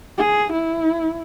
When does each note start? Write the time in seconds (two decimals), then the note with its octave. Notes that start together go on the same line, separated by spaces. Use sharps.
0.18 G#4
0.52 E4